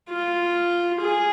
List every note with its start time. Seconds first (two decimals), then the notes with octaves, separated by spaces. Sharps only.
0.10 F4
1.01 G#4